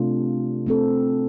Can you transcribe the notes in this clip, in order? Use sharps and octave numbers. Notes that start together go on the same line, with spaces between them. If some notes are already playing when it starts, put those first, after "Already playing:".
Already playing: C3 A3 D4 F4
A3 C4 A4